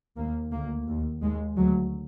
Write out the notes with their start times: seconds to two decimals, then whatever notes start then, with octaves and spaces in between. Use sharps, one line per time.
0.17 D#2 A#3
0.51 D2 A#3
0.88 D#2
1.22 D#2 G#3
1.57 D2 F#3